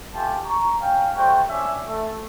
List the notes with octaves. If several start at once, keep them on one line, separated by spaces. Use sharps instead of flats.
A3 F4 G4 G#5 A5
A#5 C#6
C#4 F5 G5
G3 A3 F#4 C5 G5
C#4 D4 E5
A3